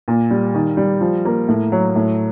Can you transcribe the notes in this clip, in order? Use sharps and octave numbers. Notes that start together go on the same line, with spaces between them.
A#2
G3
D#3
G3
F3
A#3
A2
F#3
A2